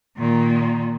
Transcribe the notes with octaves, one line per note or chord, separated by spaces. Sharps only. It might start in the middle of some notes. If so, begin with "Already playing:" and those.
A#2 D#3